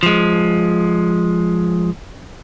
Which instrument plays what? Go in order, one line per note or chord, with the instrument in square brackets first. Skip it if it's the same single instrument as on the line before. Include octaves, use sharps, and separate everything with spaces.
[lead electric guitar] F3 G#3